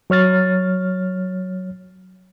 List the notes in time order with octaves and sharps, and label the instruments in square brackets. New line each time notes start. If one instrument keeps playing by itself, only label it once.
[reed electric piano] F#3 C#5 F6 A6